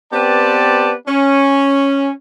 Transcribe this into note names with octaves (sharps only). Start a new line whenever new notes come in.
B3 C4 G4 B4 D5 A5
C#4